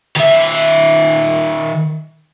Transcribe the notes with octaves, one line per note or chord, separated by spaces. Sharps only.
D#3 E5